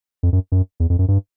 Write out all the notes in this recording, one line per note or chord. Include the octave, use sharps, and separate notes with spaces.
F2
F#2
F#2
E2
F2
F#2
G2